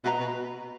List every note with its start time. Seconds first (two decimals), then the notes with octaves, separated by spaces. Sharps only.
0.04 B2 B4 D#5 A#5
0.20 B2